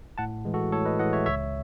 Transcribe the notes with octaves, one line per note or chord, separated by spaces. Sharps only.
A2 F#5 A5
E3 G#3
F#4 A4
A2 A4 C#5
B4 D#5
E3 G#3 D#5 F#5
C#5 E5
C#2 C#5 E5